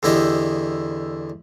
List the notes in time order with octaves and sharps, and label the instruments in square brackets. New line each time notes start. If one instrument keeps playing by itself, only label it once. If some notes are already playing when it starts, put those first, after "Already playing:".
[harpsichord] E2 D3 E4 G4 D#5